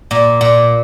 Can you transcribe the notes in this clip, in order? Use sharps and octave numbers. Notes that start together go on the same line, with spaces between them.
A#2
A#2